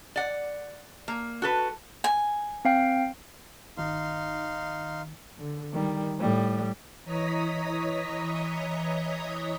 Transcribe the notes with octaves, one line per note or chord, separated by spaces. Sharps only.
D5 F#5
A#3
F#4 A4 B4
G#5
C4 F5 G5
G1 D#3 D#4 F5 C6
D3
D#3 G3
A2 G3
E3 C#5 D#5 A#5 D#6 B6